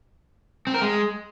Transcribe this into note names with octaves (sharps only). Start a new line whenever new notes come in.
C4
A#4
G#3